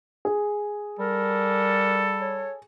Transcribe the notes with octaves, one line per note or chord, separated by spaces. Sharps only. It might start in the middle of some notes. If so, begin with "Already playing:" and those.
G#4
G3 A4 A#4
C#5